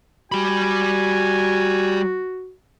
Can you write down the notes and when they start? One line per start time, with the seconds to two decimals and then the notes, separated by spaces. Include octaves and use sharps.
0.32 G3 F#4 G#5 B5